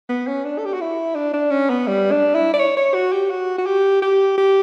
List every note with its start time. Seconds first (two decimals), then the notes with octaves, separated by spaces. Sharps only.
0.09 B3
0.27 C#4
0.45 D4
0.58 A4
0.65 G4
0.74 F#4
0.81 E4
1.16 D4
1.34 D4
1.51 C#4
1.70 B3
1.88 G3
2.12 D4
2.35 E4
2.54 D5
2.59 C#5
2.77 C#5
2.94 F#4
3.13 G4
3.30 F#4
3.58 F#4
3.66 G4
4.02 G4
4.38 G4